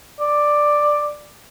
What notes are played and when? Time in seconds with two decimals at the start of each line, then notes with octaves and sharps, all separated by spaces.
0.20 D5